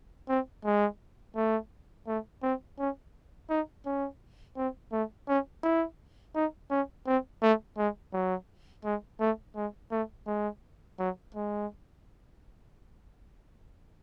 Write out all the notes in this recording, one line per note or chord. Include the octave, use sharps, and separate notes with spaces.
C4
G#3
A3
A3
C4
C#4
D#4
C#4
C4
A3
C#4
E4
D#4
C#4
C4
A3
G#3
F#3
G#3
A3
G#3
A3
G#3
F#3
G#3